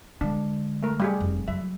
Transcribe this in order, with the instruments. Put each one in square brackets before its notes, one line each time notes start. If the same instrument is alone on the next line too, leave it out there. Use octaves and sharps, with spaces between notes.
[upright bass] D3 G#3 [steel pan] D4
[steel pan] A3 A#4
G3 G4 G#4
[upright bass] F1
[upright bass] F#3 [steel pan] E5